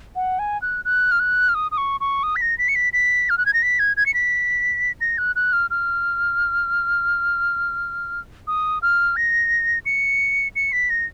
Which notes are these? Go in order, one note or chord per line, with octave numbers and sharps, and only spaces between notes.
F#5
G#5
F#6
F#6
F6
F#6
F6
D#6
D#6
C#6
C#6
D#6
B6
A#6
B6
C#7
B6
B6
F6
F#6
G#6
A#6
B6
G#6
G#6
C#7
B6
A#6
F#6
F#6
F6
F6
D#6
F6
A#6
C#7
C#7
B6
A#6